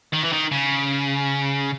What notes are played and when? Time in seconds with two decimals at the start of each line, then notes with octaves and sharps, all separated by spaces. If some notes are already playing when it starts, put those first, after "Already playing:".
0.13 D#3
0.24 E3
0.32 D#3
0.51 C#3